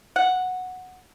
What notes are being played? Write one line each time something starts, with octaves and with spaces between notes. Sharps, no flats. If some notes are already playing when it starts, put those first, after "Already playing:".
F#5